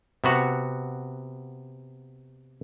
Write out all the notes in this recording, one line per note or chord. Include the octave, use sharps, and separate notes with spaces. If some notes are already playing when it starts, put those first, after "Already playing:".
C3 B3 F#4 A#5